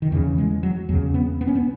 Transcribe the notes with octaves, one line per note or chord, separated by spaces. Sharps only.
D#3
E2 C#3 E3
G#3
F#3
E2 C#3 F#3
B3
B3
C#4
B3